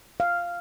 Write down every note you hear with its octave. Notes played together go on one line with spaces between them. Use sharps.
F5